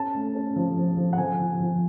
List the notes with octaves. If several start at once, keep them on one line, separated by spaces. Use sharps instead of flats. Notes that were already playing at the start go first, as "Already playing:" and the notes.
Already playing: C#4 A5
A3
C#4
F3
F3
F3
F#5
F3 G#5
F3
F3